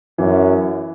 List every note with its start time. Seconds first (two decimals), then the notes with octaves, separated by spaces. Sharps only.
0.18 F#2 E3